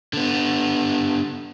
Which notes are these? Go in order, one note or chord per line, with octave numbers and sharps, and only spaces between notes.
D3 B3